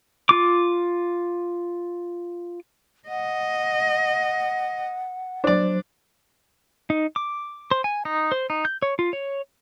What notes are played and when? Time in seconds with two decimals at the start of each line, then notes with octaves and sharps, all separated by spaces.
0.29 F4 D6
3.08 D#5 F#5
5.44 F#3 D4 C5 D5
6.90 D#4
7.16 D6
7.71 C5
7.84 G#5
8.05 D#4
8.32 C5
8.50 D#4
8.65 G6
8.82 C#5
8.99 F4
9.13 C#5